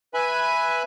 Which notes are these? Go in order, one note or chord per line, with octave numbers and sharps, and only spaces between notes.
B4 E5 G#5 B5